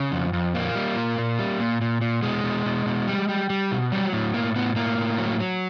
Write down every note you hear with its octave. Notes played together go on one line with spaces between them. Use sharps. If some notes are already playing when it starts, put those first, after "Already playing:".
Already playing: C#3
F2
F2
A#2 A#3
G3
A#2
A#2
G3
A#2
A#2
A#2
B2 G#3
B2
B2
B2
G3
G3
G3
B2
F#3 G3
A2
A2 A#3
A2 B3
A2 A#3
A2
F#3
F#3